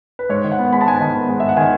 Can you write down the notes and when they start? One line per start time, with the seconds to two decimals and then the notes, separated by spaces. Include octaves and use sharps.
0.19 B4
0.29 G#2 C#5
0.44 D#3
0.52 F#5
0.59 B3
0.73 G#3 B5
0.81 A5
0.86 G#2 G#5
0.96 D#3 A5
1.15 B3
1.29 G#3
1.40 G#2 E5
1.49 F#5
1.57 D#3 G#5